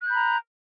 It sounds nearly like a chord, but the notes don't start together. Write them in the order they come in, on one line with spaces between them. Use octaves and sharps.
F#6 G6 B5 A#5